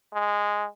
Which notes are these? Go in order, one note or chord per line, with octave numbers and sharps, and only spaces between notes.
G#3